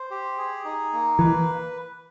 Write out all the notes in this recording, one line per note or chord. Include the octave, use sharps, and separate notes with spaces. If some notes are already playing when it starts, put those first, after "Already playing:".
Already playing: C5
G4
G#4
D#4
A#3
E3 B4